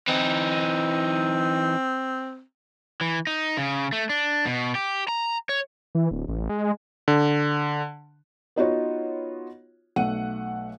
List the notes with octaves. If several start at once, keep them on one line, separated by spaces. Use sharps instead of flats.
E3 C4 D#4
E3
D#4
C#3
A3
D4
B2
G4
A#5
C#5
E3
D1
A1
G#3
D3
B3 D#4 F4 F#4 C#5
B1 A3 F#5 D#7